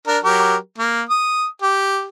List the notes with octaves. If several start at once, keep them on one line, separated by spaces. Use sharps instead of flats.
D4 A#4
F#3 G4 A#4
A#3
D#6
G4